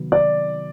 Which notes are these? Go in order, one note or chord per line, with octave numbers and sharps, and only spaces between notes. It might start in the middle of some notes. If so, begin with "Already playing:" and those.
Already playing: C3 D#3 F#3 B3
D5